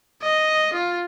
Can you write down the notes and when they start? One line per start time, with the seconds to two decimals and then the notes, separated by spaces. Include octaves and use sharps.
0.22 D#5
0.73 F4